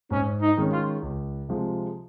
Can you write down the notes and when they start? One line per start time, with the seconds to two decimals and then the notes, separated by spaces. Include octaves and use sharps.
0.11 G#2 C#4
0.42 D#4
0.57 D#3 G#3 C#4
0.72 F4
1.02 C#2
1.49 C3 F3 G#3